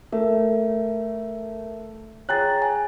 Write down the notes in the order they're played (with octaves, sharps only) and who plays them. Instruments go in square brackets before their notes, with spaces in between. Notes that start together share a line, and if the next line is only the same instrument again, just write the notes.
[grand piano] A3 [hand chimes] A#4 E5
[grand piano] G#4 G5 F#6 [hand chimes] C#5 A#5 A6
[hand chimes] G#5